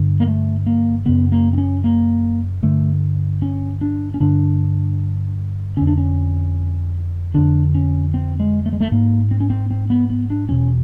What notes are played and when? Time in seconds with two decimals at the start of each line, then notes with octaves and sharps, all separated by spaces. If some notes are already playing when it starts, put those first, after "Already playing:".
Already playing: G2 D3
0.20 A#3
0.28 A3
0.67 A#3
1.05 F#2 C#3 B3
1.32 A#3
1.53 C4
1.58 C#4
1.84 A#3
2.63 G2 D3 A3
3.42 C#4
3.81 D4
4.14 C#4
4.20 G2 D3 D4
5.77 F2 D3 C#4
5.87 D4
5.98 C#4
7.34 F2 D3 D4
7.75 C#4
8.14 C4
8.40 G#3
8.66 A3
8.73 G#3
8.81 A3
8.92 G#2 A#3
9.31 C4
9.40 C#4
9.50 C4
9.71 C4
9.90 B3
10.10 B3
10.30 D4
10.49 E2 B2 C#4